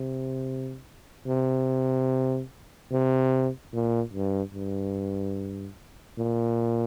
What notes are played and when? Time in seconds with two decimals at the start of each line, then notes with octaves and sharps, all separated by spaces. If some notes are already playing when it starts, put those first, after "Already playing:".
Already playing: C3
1.27 C3
2.91 C3
3.73 A#2
4.14 G2
4.55 G2
6.19 A#2